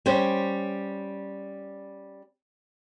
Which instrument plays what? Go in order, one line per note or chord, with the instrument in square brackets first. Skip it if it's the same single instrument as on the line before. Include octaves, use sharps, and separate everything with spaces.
[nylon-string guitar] G3 C#4 C5